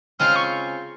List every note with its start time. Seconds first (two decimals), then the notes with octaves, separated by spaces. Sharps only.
0.19 C#3 G#3 C4 F4 F6
0.36 C#6